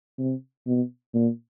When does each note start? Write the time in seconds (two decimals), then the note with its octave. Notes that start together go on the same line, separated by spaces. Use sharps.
0.19 C3
0.67 B2
1.14 A#2